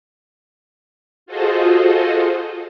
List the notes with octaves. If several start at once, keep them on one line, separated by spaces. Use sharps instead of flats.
F4 F#4 G#4 A4 C5 D#5